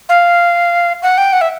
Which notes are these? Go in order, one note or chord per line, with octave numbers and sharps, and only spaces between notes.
F5
F#5
G5
F#5
E5